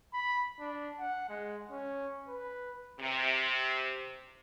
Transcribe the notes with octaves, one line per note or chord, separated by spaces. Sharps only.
B5
D4
F#5
G#3
C#4
B4
C3